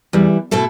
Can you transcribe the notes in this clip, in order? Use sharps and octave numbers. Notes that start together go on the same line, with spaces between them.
E2 E3 G3
B2 A3 E4 A4